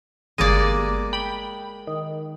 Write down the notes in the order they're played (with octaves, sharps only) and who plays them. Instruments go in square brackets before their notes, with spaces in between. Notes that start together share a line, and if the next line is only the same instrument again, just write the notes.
[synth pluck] G1 D#7 [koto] G#3 A#3 D5
[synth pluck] G5 B5
D#3